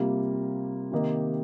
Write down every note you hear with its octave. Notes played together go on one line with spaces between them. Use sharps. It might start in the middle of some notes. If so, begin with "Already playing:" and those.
Already playing: C3 G3 A#3 F4
C3 D#3 A#3 G4 D#5